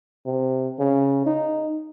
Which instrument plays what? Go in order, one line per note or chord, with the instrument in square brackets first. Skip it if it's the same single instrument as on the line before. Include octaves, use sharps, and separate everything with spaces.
[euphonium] C3
C#3
D#4